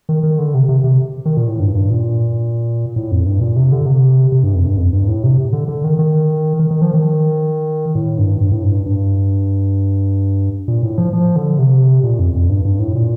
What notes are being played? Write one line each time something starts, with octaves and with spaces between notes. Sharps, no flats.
D#3
D#3
D3
C3
C3
C3
D#3
A#2
A2
G2
G2
A#2
A2
F2
G2
A#2
C3
D3
C3
C3
G2
F2
G2
F2
G2
A2
C3
D3
D3
D#3
D#3
D#3
D#3
F3
D#3
A2
G2
G2
A2
G2
G2
A#2
A2
F3
F3
D3
C3
A#2
F2
F2
G2
G2
A2
A#2